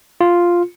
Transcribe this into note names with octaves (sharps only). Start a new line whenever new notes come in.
F4